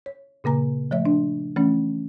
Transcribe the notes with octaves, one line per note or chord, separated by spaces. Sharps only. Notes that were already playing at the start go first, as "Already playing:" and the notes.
C#5
A#2 C#3 A#3 A#5
F3 A3 C#5 E5
D4
E3 A3 C#4